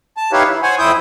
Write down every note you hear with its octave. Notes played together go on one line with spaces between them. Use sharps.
A5
D#4 E4 G4 B4 C#5 F5
E3
C5 C#5 F#5 G#5
F2 E4 C5 G5 D#6 G6